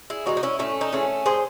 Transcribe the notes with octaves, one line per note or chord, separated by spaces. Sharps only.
E4 G#4
E3 G#3 D#4 F#4
D#4
C#4 E4
A2 A3 C#4
D#4
E3 G#3 A3 C#4
A2 G#4 C5